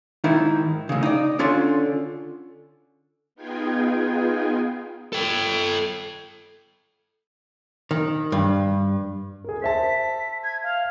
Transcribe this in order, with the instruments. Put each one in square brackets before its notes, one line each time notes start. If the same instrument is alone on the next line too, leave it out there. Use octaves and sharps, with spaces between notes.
[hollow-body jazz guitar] G#2 D#3 D#4 E4
A2 C#3
D#4 D5
D3 C#4 F4 C#5 C6
[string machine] B3 D#4 F4 G#4 G5 G#5
[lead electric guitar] A4 G5
[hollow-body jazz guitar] D#3
G2
[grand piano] G#4 A#4
[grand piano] C5 E5 A5 [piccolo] B6
[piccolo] G#6
F5